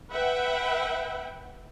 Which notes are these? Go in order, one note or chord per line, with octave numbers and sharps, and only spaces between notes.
B4 E5 F#5 G5